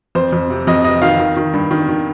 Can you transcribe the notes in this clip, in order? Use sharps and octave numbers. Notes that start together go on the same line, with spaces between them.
F2 C5
F2
C3
F2 D#5
C3 D#5
D#3 F5
D#3
D#3
G2
D#3
D#3